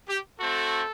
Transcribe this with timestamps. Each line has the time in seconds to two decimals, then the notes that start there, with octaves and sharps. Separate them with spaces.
0.09 G4
0.40 A3 C4 F#4 A4